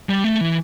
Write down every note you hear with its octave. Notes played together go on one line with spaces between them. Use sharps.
G3
A3
E3